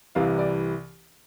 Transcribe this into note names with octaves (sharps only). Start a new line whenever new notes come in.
C2 C3 E3 F5
D5